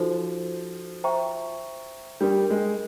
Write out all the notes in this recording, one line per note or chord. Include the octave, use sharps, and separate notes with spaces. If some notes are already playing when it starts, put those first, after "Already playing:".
Already playing: F3 D#4 F#4 A4 C5
C5 E5 G5 A#5 C#6
G3 D4 G4 A#4
G#3